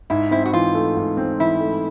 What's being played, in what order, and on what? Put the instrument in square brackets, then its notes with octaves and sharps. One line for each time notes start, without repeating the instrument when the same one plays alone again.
[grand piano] G#2 [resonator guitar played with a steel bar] E4
[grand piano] C4 [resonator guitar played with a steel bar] E4
[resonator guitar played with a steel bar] F#4
[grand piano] E3 [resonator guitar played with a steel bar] F4
[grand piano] A3
G#2
C4
[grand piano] E3 [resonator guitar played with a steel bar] E4
[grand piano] A3